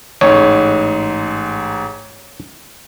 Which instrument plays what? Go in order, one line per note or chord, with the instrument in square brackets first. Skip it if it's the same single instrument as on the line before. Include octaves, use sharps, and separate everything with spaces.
[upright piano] A1 G#2 [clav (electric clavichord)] C#5